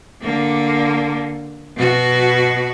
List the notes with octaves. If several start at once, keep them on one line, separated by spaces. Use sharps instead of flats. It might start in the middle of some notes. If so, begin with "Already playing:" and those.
D3 A#3
B2 F#4